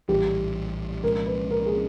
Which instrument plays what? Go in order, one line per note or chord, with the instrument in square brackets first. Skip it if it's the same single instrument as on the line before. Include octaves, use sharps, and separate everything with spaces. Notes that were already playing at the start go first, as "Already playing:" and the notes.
[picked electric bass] A#1 A2 E3 G3 [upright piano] G4
[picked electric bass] C2 A#2 F3 G#3 [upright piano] A#4
[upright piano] B4
A#4
G#4